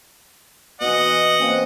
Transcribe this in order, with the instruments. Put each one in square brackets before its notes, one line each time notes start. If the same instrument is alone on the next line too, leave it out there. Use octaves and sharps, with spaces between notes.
[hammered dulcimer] B2 E3 [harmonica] D#5 F#5
[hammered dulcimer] A#3 C4 C#4